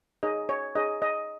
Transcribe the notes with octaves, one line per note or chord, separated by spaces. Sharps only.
D#4 G#4 C#5 D#5
C#5
D#4 G#4 C#5 D#5
D#5